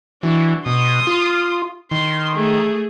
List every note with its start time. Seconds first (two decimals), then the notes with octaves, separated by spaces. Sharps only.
0.23 E3 D4 F#4
0.66 B2 C6 D#6
1.07 F4
1.91 D#3 C6
2.35 A3 G#4